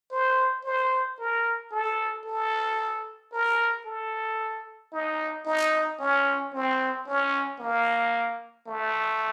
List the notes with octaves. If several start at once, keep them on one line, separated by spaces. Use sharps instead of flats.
C5
C5
A#4
A4
A4
A#4
A4
D#4
D#4
C#4
C4
C#4
A#3
A3